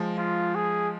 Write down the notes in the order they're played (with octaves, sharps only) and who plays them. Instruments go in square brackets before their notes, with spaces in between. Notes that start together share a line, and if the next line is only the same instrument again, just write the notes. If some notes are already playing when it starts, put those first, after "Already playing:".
Already playing: [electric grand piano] F3 G#3
[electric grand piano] F3 [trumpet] F4
[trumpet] G#4